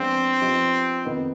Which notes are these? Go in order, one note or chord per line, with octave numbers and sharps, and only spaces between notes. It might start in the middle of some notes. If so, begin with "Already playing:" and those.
Already playing: F3 G#3 B3 C4 D4 F4
F3 B3 D#4 G4
F2 D#3 B3 D#4